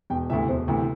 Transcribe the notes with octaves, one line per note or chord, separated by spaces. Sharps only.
E1 G5
D2 C3 E3 E5
E1 C5
D2 C3 E3